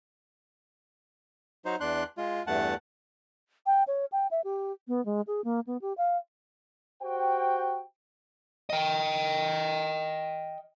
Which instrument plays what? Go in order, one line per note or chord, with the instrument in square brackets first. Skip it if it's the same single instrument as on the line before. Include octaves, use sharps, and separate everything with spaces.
[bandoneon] F#3 D#4 C5
E2 D4 C6 F#6
G#3 F4
E2 G2 A3 F#5 A5
[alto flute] G5
C#5
G5
E5
G4
B3
G#3
G#4
A#3
B3
G4
F5
[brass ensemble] F#4 G4 C5 G5
[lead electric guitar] D#5 G5